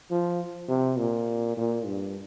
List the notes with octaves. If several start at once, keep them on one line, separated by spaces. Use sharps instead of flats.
F3
C3
A#2
A#2
G2